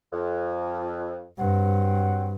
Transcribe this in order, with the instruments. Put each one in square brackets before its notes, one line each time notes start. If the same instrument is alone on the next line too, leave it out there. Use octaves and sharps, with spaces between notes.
[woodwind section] F2
[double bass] G2 [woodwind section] F#3 C4 F#5